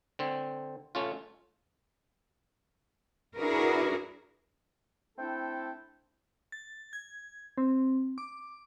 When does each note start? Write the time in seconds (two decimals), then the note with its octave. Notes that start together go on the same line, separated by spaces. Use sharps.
0.19 D3 C4
0.95 A3 C#4 F4
3.36 D4 E4 F#4 G#4 A#4 B4
5.18 A3 C4 D4 E4 A4 G5
6.52 A6
6.93 G#6
7.58 C4
8.18 D6